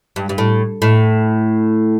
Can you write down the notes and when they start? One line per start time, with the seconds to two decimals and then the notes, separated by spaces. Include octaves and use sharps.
0.16 G2
0.29 G2
0.38 A2
0.82 A2